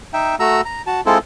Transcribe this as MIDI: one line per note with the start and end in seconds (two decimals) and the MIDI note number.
0.13 0.36 63
0.13 0.36 76
0.13 0.36 79
0.40 0.61 57
0.40 0.61 66
0.40 0.61 82
0.40 0.61 88
0.65 0.82 82
0.87 1.01 66
0.87 1.01 81
1.06 1.18 56
1.06 1.18 60
1.06 1.18 64
1.06 1.18 65
1.06 1.18 69